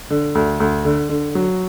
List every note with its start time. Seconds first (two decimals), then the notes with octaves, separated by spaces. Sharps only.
0.10 D3
0.35 D2
0.60 D2
0.85 D3
1.09 D3
1.35 F#3